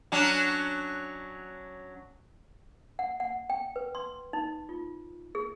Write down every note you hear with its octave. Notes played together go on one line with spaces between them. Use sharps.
F#3 C#4 D4
F#5
F#5
G5
B4
C6
D#4
F4
G#4